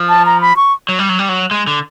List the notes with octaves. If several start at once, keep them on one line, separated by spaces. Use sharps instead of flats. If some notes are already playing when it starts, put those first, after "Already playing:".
Already playing: F3
A5
A#5
B5
C#6
F#3
G3
F#3
G3
F#3
G#3
D3